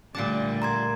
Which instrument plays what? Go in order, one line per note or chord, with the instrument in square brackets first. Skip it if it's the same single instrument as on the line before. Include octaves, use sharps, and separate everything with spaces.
[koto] A#2 F#5 A5 [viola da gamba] D3 G3 A3 [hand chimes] D6
[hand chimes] A#5 C6 G#6